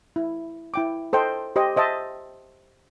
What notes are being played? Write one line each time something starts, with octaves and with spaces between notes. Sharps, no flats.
E4
E4 G5 D6
A4 C5 D#5 G5
G4 C5 D#5
C5 D#5 E5 A5